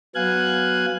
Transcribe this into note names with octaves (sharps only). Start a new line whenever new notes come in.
F#3 B3 F5 G#5 F#6 G#6